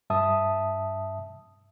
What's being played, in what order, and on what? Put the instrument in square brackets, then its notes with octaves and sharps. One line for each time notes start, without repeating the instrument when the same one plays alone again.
[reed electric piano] G2 E5 A5 D#6